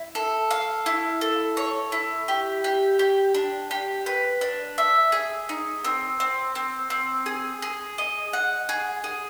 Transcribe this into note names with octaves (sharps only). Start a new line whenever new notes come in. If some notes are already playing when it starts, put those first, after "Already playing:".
Already playing: E4
A4
F5
E4
A4
C#5
E4
G4
G4
G4
D4
G4
B4
D4
E5
G#4
D#4
C4
C4
C4
C4
G#4
G#4
D#5
F#5
G#4
G#4